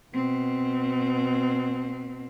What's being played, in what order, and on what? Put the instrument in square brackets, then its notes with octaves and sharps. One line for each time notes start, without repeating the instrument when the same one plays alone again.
[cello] B2 C4